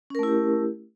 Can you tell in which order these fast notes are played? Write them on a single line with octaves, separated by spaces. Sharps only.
C#4 A#4 A3 E4 G4